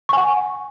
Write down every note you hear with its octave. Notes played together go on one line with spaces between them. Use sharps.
F#5 G#5 C#6